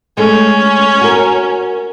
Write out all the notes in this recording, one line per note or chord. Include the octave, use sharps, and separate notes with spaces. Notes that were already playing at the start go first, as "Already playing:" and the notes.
G#3 A3 C#4
F#4 A#4